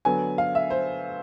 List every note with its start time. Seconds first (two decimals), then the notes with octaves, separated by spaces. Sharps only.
0.05 D3 F#3 B3 G#5
0.38 F5
0.55 E5
0.70 C5